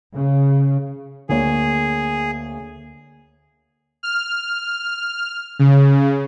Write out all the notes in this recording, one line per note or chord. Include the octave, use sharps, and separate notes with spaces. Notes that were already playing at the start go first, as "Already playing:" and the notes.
C#3
D2 A#3 G#4 C#5
F6
C#3